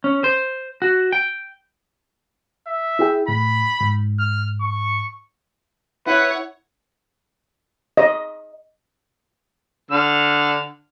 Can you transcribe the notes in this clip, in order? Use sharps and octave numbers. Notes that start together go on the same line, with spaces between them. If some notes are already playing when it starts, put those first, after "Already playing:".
C#4
C5
F#4
G5
E5
E4 G#4 G5
A2 B5
G#2
F6
C#6
E4 B4 C#5 F#5
D#5
D3 F6